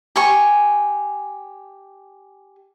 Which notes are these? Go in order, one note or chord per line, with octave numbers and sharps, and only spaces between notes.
G4 G#5 C#6